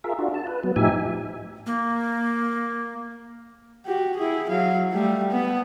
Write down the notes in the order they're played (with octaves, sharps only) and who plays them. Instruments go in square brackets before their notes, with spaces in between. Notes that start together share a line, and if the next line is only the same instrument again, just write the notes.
[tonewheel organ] F4 G#4 A#4 E5
D4 F4 F#4
A5
B4
F#3 B3
A2 F3 D#4 G4 E5 G#5
[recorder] A#3
[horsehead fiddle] F#4 G4
E4 G#4
F#3 F5
G3 A3
B3